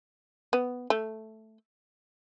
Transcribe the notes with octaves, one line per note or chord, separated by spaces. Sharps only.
B3
A3